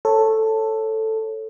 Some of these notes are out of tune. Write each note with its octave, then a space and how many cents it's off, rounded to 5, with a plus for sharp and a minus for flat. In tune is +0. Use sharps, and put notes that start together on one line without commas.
A4 +5 C#5 -15